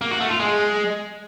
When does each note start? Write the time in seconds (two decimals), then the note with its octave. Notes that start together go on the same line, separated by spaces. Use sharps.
0.01 A#3
0.11 F#4
0.20 A3
0.30 F4
0.40 G#3